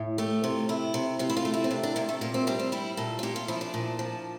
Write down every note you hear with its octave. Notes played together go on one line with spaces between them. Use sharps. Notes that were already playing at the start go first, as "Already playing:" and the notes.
Already playing: A2
A3 G4
C3 F4
C3 E4
C3
C3 F4
E4
F4
A3
E4
C4
C3 D4
D4
C3 A#3
A3
A#2 A#3
C4
G3 D4
C4
G3 E4
A#2 A4
F4
A#2 G4
F4
F3 E4
D4
A#2
F3